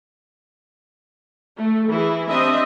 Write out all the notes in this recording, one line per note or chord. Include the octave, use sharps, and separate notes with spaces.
A3
E3 E4 G#4
C4 D4 G4 D#5 E5